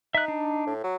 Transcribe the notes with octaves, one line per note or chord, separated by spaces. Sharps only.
D#4 E5 F#6
D4
A2
F#3